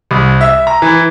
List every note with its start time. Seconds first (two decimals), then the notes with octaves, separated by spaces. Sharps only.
0.11 C2
0.41 E5
0.67 A#5
0.82 E3